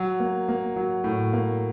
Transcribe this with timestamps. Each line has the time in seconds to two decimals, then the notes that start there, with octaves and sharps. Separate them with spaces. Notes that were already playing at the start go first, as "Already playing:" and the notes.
Already playing: F#3
0.20 A#3
0.48 A#3
0.76 F#3
1.04 A2
1.33 A#3